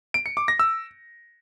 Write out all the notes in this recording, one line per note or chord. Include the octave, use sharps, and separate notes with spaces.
D7
C#7
D6
A#6
E6